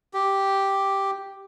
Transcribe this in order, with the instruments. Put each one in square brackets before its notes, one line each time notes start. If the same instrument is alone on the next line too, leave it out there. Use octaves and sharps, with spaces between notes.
[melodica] G4